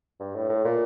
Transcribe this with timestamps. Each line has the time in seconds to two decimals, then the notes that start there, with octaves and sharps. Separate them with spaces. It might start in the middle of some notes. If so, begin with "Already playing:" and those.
0.20 G2
0.35 A2
0.49 A2
0.64 A#2